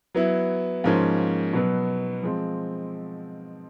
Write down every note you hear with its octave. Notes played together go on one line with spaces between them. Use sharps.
F#3 B3 E4
G#2 F3 A#3 C#4
B2 F#3 B3
F3 G#3 C4